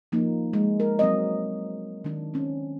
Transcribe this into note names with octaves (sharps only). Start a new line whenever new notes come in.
F3 A#3 D#4
G#3
A#4
F#3 C4 D#5
D#3 D4
C4 C#4